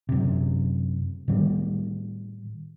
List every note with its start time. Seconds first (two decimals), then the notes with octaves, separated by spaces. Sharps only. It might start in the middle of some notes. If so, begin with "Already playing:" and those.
0.09 F#2 C3
1.28 A2 D#3 G3